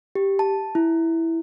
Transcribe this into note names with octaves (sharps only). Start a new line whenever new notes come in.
G4
A5
E4